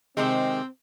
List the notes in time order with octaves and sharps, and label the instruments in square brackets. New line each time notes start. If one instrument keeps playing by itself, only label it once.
[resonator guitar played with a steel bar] C3 D#3 G#3 [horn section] C4